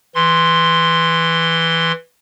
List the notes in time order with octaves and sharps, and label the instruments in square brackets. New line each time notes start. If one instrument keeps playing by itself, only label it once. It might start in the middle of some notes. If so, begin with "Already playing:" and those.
[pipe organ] E3 C6